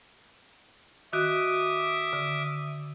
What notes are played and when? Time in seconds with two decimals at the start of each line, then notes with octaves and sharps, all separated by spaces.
1.13 D#3 F#4 E5 D6 D#6
2.13 D3